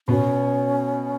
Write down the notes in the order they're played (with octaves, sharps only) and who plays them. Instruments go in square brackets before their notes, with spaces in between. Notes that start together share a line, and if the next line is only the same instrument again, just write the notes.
[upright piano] B2 B3 [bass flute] C#4